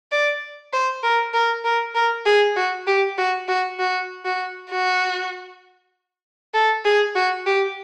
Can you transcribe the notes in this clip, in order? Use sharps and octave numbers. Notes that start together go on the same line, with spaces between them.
D5
C5
A#4
A#4
A#4
A#4
G#4
F#4
G4
F#4
F#4
F#4
F#4
F#4
A4
G#4
F#4
G4